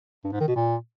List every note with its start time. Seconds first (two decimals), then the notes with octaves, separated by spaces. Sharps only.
0.24 G2
0.32 G#2
0.40 D#3
0.48 B2
0.56 A#2